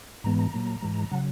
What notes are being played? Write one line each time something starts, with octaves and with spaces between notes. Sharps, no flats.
G#2 E3 G#3 B3 A#5
A#5
A#2 F#3 A#3
G#2 E3 G#3
C#3 F#3 F#5